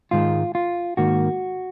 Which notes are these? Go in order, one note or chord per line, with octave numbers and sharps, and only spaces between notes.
G#2 D#3 G#3 F4
F4
G#2 D#3 A#3 F#4